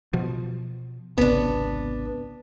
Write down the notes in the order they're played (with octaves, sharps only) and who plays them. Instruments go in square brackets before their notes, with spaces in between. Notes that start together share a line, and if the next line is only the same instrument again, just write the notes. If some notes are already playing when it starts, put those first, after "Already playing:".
[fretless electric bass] B2 F3
[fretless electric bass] G#1 C#2 C3 [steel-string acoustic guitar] B3 D4